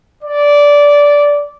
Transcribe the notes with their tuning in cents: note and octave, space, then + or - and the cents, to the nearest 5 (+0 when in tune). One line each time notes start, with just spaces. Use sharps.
D5 -15